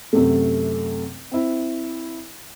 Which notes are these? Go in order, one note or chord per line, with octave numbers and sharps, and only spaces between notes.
F#2 C3 A3
C4 E4